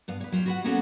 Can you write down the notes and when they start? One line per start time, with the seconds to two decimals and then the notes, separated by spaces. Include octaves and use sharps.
0.08 G2 B3 F5
0.20 B4 C#5
0.32 F#3 F4 G4
0.46 F#4 B4 F#5
0.64 A#3 B3 C#4 F#4 A4 F#5